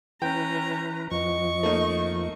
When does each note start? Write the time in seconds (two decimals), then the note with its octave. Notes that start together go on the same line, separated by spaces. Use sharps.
0.22 E3 C#4 B4 G5 A#5
1.11 F2 F3 D#5 C#6
1.63 A3 A#3 D#4